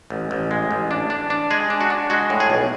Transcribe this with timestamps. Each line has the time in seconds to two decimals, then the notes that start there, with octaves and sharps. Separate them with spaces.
0.10 A1
0.31 A1
0.51 G#3
0.71 A1
0.91 D4
1.10 D4
1.30 D4
1.50 G#3 G#4
1.70 D4
1.81 F#4
1.90 D4
2.10 G#3 F#4
2.30 A2
2.40 G#4
2.50 B1